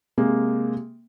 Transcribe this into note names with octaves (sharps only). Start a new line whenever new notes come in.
C3 G#3 A#3